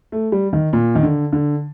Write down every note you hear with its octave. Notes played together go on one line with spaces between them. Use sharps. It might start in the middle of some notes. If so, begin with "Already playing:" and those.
A3
G3
D#3
A#2
D#3
D3
D3